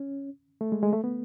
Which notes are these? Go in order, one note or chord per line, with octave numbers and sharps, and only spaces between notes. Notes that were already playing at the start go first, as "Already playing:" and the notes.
Already playing: C#4
A3
G#3
G#3
A3
B3